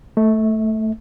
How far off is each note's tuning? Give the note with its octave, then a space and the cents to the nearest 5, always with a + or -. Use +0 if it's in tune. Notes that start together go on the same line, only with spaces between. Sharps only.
A3 +0 E5 -30